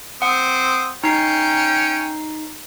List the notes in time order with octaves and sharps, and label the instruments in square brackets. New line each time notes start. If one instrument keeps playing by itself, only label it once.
[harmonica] C4 D#6 [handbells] F#5
[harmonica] C#4 G5 [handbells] D#4 C7